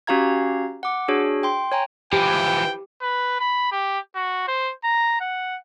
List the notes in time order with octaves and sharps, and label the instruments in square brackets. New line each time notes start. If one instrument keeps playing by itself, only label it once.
[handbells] C#4 F#4 G4 F5 A#5 G#6
F#5 D6
D4 F#4 G#4 C#5
G5 C6
C#5 G5 G#5 A#5
[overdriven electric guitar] E3 F3 [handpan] G4 [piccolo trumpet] G5
[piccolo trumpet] B4
B5
G4
F#4
C5
A#5
F#5